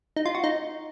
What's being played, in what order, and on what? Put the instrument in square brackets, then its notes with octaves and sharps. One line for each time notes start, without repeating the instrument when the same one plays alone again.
[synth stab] D#4
F4
F#4
D#4